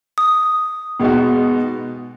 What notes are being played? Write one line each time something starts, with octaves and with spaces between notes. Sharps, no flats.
D#6
B2 G#3 B3 D#4 F#4